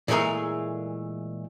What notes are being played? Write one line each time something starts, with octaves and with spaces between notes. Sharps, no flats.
A#2 E3 G#3 A3 G#4 A#4